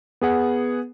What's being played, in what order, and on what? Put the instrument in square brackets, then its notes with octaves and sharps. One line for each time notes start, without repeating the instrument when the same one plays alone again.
[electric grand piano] B3 G#4 F#5